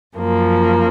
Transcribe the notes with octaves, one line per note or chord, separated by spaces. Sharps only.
F#2 F3 A#3